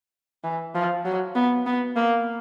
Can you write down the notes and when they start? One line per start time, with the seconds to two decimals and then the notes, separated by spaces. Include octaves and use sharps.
0.44 E3
0.75 F3
1.05 F#3
1.35 B3
1.66 B3
1.96 A#3